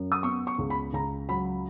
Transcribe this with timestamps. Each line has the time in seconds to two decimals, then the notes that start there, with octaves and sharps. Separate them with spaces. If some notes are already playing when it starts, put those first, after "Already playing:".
Already playing: F#2
0.12 D#6
0.23 B3 C#6
0.47 C#6
0.58 C#2
0.70 B5
0.93 C#2 A#5
1.29 F#3 B5